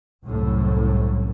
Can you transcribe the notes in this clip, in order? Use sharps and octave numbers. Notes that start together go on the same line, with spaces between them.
C2 F#2 A2